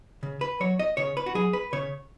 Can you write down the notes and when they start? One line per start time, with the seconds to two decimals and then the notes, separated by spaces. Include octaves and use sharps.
0.23 C#3
0.41 B4
0.60 F#3 C#5
0.79 D#5
0.97 C#3 C#5
1.17 B4
1.26 F#4
1.35 F#3 G#4
1.53 B4
1.73 C#3 C#5